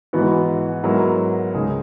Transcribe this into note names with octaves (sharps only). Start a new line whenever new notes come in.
G#2 E3 B3 F#4
G#2 F#3 B3 E4 A#4
C#2 C#3 G#3 D#4 G#4